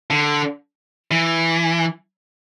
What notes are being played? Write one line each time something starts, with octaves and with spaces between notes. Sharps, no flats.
D3
E3